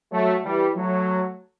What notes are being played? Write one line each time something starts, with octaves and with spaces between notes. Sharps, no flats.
F#3 A3
E3 G3
F#3 A3